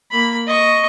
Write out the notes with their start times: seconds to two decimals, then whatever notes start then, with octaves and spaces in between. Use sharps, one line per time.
0.11 A#3 B5
0.47 D#5 C#6